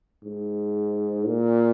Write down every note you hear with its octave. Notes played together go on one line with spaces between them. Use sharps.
G#2
A#2